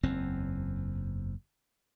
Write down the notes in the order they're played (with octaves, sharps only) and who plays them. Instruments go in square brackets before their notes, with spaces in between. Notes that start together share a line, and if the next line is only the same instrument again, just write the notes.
[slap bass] F#1 E2 C4